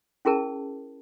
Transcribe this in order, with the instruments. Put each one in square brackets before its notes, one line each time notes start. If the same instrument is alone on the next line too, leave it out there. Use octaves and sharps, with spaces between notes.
[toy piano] C#4 E4 G#4 A#4 A5